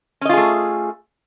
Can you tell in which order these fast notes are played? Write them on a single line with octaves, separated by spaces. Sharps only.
C#4 D#5 F4 G#4 A3